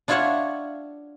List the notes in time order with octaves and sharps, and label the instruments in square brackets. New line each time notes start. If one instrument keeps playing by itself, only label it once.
[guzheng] D4 E4 F4 C#5 E5 F#5